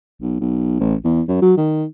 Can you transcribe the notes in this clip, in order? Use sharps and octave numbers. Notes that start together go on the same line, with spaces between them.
B1
B1
A1
E2
F#2
F#3
D#3